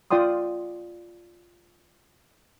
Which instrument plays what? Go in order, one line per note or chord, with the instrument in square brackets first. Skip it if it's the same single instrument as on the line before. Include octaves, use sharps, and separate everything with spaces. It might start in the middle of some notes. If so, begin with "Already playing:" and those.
[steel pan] F4 D5 G5 C6 D#6